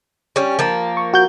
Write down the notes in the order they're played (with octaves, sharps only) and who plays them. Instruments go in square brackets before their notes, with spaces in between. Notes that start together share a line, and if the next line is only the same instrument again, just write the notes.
[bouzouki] G3 C#4
F3 A#3
[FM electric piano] C#6
F#4 G6